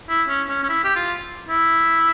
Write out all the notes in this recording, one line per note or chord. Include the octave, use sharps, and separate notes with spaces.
E4
C#4
C#4
C#4
E4
G4
F4
E4